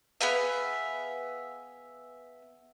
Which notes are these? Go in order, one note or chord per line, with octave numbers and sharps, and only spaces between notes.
B3 G#4 E5 F5